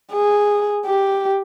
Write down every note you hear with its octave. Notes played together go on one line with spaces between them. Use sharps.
G#4
G4